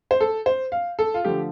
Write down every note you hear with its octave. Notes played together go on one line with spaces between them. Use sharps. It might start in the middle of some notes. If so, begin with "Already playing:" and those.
C5
A4
C5
F5
A4
F4
D3 F3 A3 G4